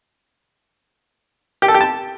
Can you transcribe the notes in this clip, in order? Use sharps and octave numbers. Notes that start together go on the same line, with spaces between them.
G4
A4
G4
A5